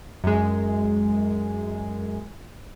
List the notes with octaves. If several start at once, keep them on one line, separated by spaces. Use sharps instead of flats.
F#2 G#3